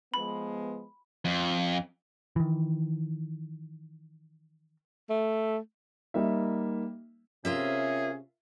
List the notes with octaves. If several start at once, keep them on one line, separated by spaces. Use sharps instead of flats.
F3 G#3 B3 B5
F2
D#3 E3
A3
G3 A#3 D#4 E5
C3 C#4 F4 G#4 A#4 E5